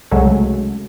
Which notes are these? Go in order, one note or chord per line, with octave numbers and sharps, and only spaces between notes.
C2 C#3 F#3 G#3 A3